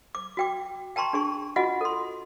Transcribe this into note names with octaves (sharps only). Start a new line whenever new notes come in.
D6
F#4 G5 D6
G5 A5 A#5 C6 C#6
D4 G#4 C#6
F4 F#4 D#5 F#5 G#5
A4 C6